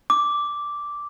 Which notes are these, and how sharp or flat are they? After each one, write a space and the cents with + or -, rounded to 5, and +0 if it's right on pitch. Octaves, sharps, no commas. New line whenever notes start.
D6 -5